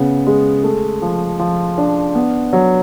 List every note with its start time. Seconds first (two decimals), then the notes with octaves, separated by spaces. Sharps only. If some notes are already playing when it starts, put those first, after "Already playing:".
Already playing: C#3 B3
0.27 G#3
0.63 A3
1.02 F3
1.39 F3
1.78 D4
2.15 B3
2.53 F#3